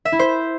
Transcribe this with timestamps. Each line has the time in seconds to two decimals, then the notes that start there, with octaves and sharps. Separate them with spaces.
0.05 E5
0.12 E4
0.19 C5